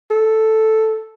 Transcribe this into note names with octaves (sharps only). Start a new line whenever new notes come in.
A4